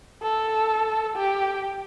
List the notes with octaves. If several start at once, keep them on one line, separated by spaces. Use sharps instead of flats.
A4
G4